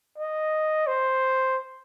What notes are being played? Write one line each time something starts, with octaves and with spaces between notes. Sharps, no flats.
D#5
C5